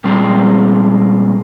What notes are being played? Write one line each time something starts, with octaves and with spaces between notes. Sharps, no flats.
A#2 G3 G#3 C4